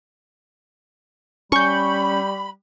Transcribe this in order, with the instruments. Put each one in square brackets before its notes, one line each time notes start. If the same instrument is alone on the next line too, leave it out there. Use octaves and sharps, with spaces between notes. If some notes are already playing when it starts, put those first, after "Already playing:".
[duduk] G3 [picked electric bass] C#4 [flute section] B5 [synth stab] C#6 G6